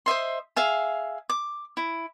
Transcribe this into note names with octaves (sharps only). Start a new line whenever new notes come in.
C5 D#5 E5 C6
G#4 E5 F5
D6
E4